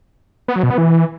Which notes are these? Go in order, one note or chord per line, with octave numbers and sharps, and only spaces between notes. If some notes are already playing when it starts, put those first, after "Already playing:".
B3
F#3
B2
B3
E3